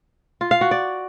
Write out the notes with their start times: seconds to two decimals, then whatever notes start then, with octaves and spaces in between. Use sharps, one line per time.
0.41 F4
0.51 F5
0.61 F#4
0.71 D5